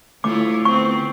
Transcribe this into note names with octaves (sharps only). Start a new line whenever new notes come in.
D2 A3 E4 F4 C#5 D6
B3 C4 C#6